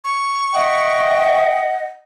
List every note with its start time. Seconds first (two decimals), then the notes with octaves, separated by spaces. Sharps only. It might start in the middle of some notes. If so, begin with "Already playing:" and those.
0.04 C#6
0.54 D#5 E5 F#5 G5 D#6